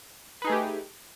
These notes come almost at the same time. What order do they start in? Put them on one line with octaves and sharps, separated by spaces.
B4 D#4 G#4 A3 G4